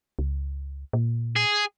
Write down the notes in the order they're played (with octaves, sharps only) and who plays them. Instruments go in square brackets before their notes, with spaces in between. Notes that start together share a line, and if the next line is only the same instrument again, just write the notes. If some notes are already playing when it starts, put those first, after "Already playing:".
[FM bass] C#2
A#2
[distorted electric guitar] G#4